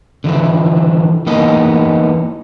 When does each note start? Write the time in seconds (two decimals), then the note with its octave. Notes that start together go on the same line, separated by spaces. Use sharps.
0.24 D3 E3 F3 E4
1.27 E3 A#3 B3 D#4 D#5